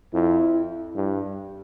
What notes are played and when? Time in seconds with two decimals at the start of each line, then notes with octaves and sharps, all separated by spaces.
0.13 F2 E4
0.96 G2